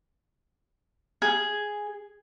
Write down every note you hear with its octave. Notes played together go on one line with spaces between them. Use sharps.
G#4